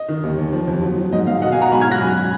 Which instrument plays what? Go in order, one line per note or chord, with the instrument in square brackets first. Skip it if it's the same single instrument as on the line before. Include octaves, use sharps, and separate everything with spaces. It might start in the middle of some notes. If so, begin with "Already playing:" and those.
Already playing: [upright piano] D#5
D#3
D#2
D#2
F3
F2
F#3
F#3
G#2 D#5
G#2 F5
B2 D#5 F#5
F5 G#5
B2 F#5 A#5
G#2 G#5 B5
F6 G#6
F#3
F#6 A#6
F#2 G#5 B5